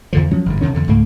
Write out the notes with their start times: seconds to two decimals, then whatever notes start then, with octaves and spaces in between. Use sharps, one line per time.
0.13 E2 D3 F3
0.31 F3 F#3 C#4
0.46 G1 G#2
0.61 D#2 C3 D#3 C#4
0.74 E2 D3
0.87 C#2 G#2 A3 A#3